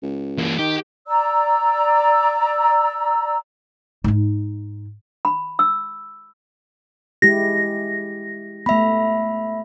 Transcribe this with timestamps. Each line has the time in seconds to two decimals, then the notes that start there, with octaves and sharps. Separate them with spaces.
0.02 C#2
0.38 E3 A#3
0.58 D#3 G4
1.07 D5 A#5 E6
4.04 G#2 D#4
5.25 B5
5.59 E6
7.22 G#3 E4 G4 A#6
8.66 A3 B3 E5 B5